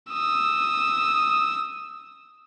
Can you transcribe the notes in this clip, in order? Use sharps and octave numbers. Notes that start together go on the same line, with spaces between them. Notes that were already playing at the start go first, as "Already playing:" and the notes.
D#6 E6